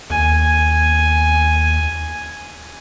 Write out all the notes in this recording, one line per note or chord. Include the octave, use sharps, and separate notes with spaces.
D#2 G#5